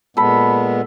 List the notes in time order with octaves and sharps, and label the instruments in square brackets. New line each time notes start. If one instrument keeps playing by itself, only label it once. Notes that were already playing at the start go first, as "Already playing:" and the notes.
[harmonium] A#2 G#3 B3 [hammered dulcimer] A4 B5